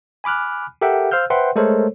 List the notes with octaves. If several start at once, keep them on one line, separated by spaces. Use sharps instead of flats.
G#5 B5 D6 F6 F#6
G4 A4 A#4 E5 F#5 G5
C5 F5 E6 F6 G6
B4 C5 E5 F#5 G5 C6
G#3 A3 A4 A#4 C5 C#5